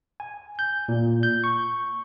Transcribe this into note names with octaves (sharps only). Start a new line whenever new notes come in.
G#5
G6
A#2
G6
C#6